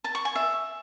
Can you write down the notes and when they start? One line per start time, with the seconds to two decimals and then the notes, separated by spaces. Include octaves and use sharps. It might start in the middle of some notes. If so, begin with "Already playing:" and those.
0.04 A5
0.15 C#6
0.25 G#5
0.35 E5